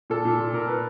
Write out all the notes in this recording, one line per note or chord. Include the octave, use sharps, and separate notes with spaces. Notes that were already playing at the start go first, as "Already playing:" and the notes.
A#2 A4
A#2
A#2
A#2 A#4
A#2 B4